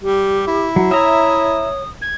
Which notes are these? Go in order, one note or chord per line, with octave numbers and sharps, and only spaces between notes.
G3 G4
E4
F#3
C#5 E5 A#5 D#6
G#6